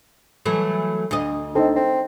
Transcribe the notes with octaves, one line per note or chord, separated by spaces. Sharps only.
E3 F#3 A3
D2 D#5
C4 D4 D#4 A4
C4